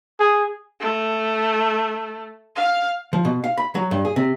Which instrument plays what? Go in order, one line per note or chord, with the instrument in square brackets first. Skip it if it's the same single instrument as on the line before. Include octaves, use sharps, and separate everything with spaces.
[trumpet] G#4
[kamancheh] A3
F5
[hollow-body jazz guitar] F3
B2
F5
B5
F#3
G2
G#4
C3